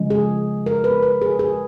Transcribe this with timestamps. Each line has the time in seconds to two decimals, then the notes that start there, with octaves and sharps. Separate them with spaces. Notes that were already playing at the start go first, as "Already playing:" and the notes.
Already playing: C#3 F3 G#3
0.10 G#4
0.66 A#4
0.84 B4
1.03 B4
1.22 G#4
1.39 G#4